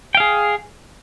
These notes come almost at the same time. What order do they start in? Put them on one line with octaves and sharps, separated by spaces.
G5 F5 G#4